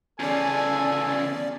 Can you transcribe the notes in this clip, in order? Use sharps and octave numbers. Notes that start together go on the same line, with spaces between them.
E2 C#3 C#4 A4 D5 G#5